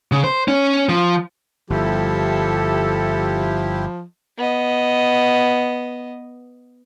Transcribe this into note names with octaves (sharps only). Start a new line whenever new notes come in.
C#3
C5
C#4
F3
G1 F3 E4 G4 A4
B3 D#5